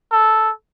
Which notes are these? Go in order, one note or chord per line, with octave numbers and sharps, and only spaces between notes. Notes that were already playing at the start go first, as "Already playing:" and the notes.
A4